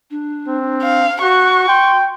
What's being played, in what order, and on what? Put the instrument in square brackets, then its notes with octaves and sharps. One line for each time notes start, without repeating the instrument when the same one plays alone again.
[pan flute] D4
[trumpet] C4
[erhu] F5
[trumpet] F#4 [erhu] C#6 [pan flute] F#6
[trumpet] G5 [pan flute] C6